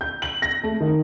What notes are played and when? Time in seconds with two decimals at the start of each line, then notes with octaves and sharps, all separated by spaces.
0.01 G6
0.22 F#7
0.42 A#6
0.63 A3
0.80 D#3